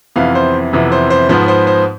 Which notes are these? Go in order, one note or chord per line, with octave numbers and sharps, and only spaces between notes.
F2 C3 E3 B3 F5
C5
F2 C3 E3 B3
C5
C5
G#2 F3 B3 C5
C5
C5